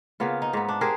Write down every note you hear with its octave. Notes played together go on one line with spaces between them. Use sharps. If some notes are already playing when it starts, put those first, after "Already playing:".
C#3 A#3 B3 F4
D#4
G#2 B3
D4
G4 G#4 A#4 C5